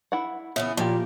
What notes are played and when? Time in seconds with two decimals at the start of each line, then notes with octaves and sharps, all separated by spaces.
0.12 E4 F#5
0.56 C#3 E3 B3 E5
0.77 A#2 F3 A#3 G4